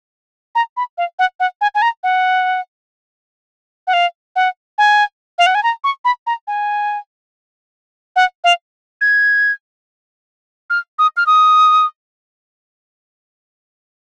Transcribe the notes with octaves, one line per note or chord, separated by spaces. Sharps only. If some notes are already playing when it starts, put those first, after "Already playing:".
A#5
B5
F5
F#5
F#5
G#5
G#5
A#5
F#5
F#5
F5
F#5
G#5
F5
F#5
G#5
A#5
C#6
B5
A#5
G#5
F#5
F5
G#6
F6
D#6
F6
D#6